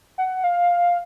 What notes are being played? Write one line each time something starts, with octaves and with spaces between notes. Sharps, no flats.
F#5
F5